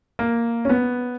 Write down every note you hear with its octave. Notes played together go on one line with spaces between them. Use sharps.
A#3
C#4
B3